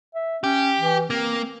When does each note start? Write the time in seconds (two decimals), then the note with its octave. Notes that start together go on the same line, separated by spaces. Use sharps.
0.15 E5
0.44 C#4 G4
0.79 E3
1.10 A#3 C4